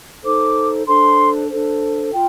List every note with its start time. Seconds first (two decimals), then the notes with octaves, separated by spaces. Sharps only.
0.24 D#4 A4 C5 D6
0.87 D4 A4 C5 C6
1.49 D4 A4 C5
2.11 F4 G5